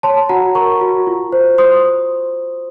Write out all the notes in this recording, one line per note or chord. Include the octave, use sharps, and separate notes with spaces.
C#5 A5 C6
F#4 F#5 A#5
A#4 A#5 C#6
F#4
F4
C5
C5 C6 D#6